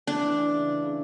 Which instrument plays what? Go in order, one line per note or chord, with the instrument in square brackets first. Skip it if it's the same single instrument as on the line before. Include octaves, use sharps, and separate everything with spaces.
[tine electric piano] A3 [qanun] D4
[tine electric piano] E3
E3
C#3
E3
C#3